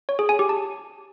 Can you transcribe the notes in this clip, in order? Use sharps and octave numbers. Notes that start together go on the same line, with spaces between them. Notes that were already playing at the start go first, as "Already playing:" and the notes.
C#5
G#4
G#5
G4
A5